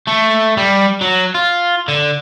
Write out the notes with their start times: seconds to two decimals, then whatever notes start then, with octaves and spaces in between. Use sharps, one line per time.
0.07 A3
0.57 G3
1.01 F#3
1.35 F4
1.88 D3